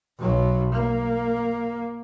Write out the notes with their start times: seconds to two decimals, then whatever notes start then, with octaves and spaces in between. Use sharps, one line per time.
0.19 B1 F#3
0.73 A#3